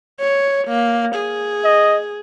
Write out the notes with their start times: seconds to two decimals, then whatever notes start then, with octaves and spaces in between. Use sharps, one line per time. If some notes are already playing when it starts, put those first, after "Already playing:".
0.20 C#5
0.68 A#3
1.15 G#4
1.65 D#5